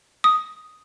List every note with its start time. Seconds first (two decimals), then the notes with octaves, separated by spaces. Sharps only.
0.24 D#6